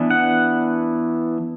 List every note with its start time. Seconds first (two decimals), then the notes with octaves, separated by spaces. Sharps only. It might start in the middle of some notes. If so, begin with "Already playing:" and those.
Already playing: E3 B3 D4
0.11 F#5